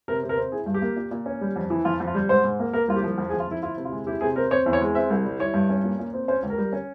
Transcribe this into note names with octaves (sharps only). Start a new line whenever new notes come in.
C3 A#4
C3
A#4
C4
E4 G#4
G2
G4
A#3
A#2
A#2
C#4
G3
F2
E3
F2 F4
F2
F4
G3
G#2 C5
G#2
A#3
A#3 A#4
C2 F4
G4
F3
F2
G#4
F2
F4
F3 E4
E4 F4
C3
F4
G#3
E4 G4
C3 G#4
C4 A#4
C4 C#5
E2
C#5
G#3
C4 E5
C2
G3
E4 C#5
G2
C#4
A#2
A#2
C4
C#4 C5
C#2
A#4
G3
C#4